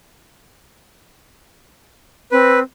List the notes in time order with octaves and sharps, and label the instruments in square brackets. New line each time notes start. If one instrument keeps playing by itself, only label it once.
[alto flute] C4 [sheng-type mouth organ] B4